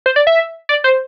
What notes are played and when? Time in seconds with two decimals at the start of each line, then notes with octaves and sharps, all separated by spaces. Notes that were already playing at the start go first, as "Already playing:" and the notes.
0.06 C5
0.16 D5
0.27 E5
0.69 D5
0.84 C5